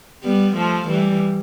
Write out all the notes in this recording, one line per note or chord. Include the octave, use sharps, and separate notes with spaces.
G3 B3
F3 A3
E3 G3